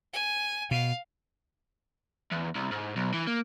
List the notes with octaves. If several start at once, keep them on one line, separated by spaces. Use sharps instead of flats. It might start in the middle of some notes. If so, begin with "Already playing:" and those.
G#5
B2 F5
E2
C2
G#2
B1
E3
A#3